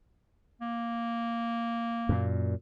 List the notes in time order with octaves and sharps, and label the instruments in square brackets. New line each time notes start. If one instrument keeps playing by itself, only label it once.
[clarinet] A#3
[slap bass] F#2 A#2